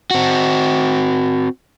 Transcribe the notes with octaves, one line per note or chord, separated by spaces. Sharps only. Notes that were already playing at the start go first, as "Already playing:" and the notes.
C4 F#4